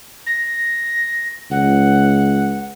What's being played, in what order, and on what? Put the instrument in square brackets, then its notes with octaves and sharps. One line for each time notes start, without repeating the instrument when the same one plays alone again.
[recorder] A#6
[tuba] C#2 [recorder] F#5